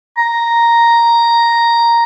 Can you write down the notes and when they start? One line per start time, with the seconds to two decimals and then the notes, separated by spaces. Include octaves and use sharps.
0.17 A#5